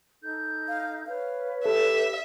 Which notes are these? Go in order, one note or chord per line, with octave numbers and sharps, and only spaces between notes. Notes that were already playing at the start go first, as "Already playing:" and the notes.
D#4 A4 G6
F5
B4 C#5 F5
G4 A4 E5